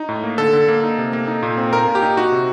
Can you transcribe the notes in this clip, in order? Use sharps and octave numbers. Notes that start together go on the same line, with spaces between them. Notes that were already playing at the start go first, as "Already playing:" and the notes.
Already playing: D#4
A2
A#3
D3 A4
D3
A#3
D#4
C3
A#3
D#4
A#2
C4
A#2 A#4
A#2
G4
D#4
D#4 F#4
C3